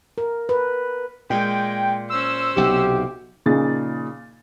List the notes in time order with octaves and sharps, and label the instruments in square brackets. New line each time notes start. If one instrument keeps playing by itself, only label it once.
[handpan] A#4
B4
[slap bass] A#2 [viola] G#3 [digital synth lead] G5
[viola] C#4 C5 [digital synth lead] E6
[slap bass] B1 C3 [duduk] G4
[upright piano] A#2 C#3 F3 D#4 G#4 A6